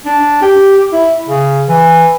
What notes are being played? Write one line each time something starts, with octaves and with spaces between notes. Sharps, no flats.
D4
G4
E4
C#3
E3